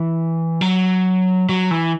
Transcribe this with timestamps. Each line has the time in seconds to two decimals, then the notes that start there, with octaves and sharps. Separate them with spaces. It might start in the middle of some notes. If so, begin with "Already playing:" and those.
Already playing: E3
0.61 F#3
1.49 F#3
1.71 E3